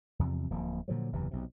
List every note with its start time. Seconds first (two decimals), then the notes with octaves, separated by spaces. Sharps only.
0.19 E2 C3 F3
0.51 D1 F3 A#3
0.88 A#2 D3 F3 F#3
1.13 F#1 E2 C3 E3
1.31 B1 C3